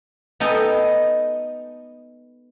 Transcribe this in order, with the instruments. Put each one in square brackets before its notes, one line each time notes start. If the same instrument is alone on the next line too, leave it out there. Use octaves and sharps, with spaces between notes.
[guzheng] B3 D#4 A4 G5 G#5